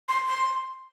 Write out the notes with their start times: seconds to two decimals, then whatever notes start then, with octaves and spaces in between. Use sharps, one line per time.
0.08 C6
0.26 C6